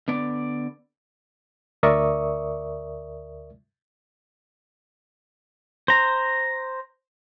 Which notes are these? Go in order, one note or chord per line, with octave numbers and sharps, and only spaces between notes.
D3 B3 D5
D2 A#4 D5 E5 C#6 D#6
C5 A#5